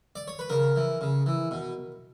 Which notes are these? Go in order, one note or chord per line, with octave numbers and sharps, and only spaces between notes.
D5
C#5
B4
C#3 A#4
E3
C#3
E3
B2